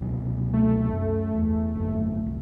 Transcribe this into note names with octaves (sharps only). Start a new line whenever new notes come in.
C#2 B2 F#3
A3
F#2
E2
G#1 F#2
C2